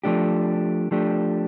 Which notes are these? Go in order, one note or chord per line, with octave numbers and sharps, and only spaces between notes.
F3 A3 D4 G4
F3 A3 D4 G4